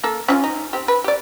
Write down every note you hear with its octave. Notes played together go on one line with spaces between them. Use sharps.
A#3 A4
C#4 D4 F4
D#4
C4 G4
B4
G4 D5